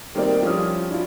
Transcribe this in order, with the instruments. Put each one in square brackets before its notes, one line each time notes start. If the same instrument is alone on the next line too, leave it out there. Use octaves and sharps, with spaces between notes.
[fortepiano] D#3 G3 A#3 C4 A#4 D5
F3 G3 C#4 E4 D#6 F6
D4 E4 F4